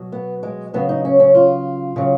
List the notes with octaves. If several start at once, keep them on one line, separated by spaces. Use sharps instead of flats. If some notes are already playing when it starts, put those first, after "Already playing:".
Already playing: B2 F#3
B3
G#3
C#3 F#3 B3
D#4
C#4
C#4
F4
C#3 F#3